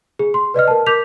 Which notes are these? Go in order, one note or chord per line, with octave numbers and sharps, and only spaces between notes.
G#4
C6
B4 D5 D#5 F6
A#4 A5
A#4 D6 G6 B6 F7